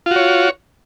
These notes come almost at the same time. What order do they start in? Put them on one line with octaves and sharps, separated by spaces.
F4 F#4 C#5